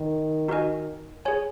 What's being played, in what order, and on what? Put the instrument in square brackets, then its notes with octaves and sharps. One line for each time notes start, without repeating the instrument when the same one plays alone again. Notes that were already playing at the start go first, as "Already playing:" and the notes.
Already playing: [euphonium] D#3
[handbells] D#4 F#4 A#4 D#5 G#5
G#4 C#5 G#5